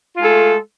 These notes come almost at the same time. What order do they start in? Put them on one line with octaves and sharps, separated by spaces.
F4 G#3 A4 A3